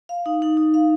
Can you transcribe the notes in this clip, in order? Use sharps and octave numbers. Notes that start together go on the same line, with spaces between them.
F5
D#4
D#4
D#4
F5